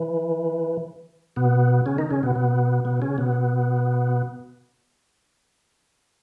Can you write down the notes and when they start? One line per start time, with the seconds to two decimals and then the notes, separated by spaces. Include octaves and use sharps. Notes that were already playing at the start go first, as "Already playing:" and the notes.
Already playing: E3
1.36 B2 B3
1.86 C#3 C#4
1.98 D#3 D#4
2.11 C#3 C#4
2.23 B2 B3
2.35 B2 B3
2.85 B2 B3
3.02 C#3 C#4
3.18 B2 B3